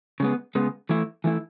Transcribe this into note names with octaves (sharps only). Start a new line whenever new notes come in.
C#3 G#3 B3
C#3 G#3 B3
E3 A3 E4
E3 A3 E4